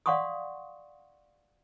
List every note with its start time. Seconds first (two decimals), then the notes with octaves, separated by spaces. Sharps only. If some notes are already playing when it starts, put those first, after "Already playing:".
0.06 D5 F5 F#5 C6 C#6 D#6